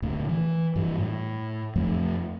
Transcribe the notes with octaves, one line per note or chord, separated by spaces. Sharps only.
D2 A#2
E3
G2 E3 G3
A2
F2 F3 A3